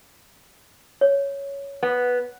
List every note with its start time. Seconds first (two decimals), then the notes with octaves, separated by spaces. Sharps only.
1.01 C#5
1.83 B3